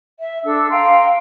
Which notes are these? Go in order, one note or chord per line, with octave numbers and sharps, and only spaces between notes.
E5
D4 A4 E6
F5 G5 A#5 C6